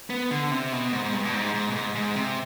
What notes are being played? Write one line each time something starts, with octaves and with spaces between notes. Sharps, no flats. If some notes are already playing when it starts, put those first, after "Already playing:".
B3
D3
C3
B2
G#2
G#2
G2
B2
G#2
G#2
B2
G#2
G#2
C3